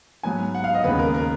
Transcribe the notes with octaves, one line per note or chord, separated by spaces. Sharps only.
G#2 F#3 B3 G#5
F#5
F5
D#5
D#2 C#3 G#3 B3 B4
A#4
A#4